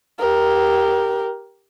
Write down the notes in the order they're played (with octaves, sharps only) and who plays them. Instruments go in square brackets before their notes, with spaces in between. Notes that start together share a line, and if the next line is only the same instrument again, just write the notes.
[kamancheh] G4 A#4